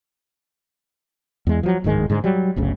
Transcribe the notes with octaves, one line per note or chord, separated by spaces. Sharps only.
E2 G#3
F3 F#3
D1 G#2 D#3 G#3
G#2 D3 G#3
F#3 G3
G1 D2 C#3